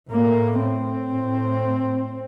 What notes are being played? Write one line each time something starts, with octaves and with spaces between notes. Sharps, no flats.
A2 A#3
C4
A2